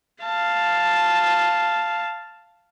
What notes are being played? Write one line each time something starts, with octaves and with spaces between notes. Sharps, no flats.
F5 A5